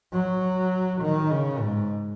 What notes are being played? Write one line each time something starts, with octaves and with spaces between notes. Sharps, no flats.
F#3
D#3
C#3
G#2